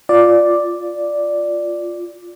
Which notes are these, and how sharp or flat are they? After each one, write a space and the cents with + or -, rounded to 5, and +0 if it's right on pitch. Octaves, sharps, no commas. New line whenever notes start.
F4 +0 D5 +0